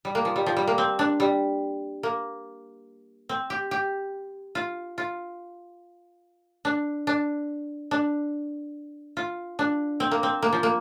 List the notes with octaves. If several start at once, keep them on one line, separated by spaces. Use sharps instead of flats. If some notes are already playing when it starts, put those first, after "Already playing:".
G3
A#3
F3
G3
F3
G3
A#3
C4
D4
G3
A#3
C4
G4
G4
F4
F4
D4
D4
D4
F4
D4
C4
A#3
C4
A#3
F3
A#3